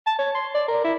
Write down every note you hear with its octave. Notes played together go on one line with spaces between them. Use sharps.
A5
C#5
C6
D5
A#4
E4